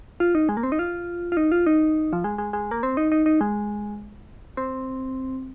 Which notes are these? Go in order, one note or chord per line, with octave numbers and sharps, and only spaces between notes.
F4
D#4
G#3
A#3
C4
D#4
F4
F4
D#4
F4
D#4
F3
G#3
G#3
G#3
A#3
C4
D#4
D#4
D#4
G#3
C4